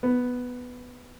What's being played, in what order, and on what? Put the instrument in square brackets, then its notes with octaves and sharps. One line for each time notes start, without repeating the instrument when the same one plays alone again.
[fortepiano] B3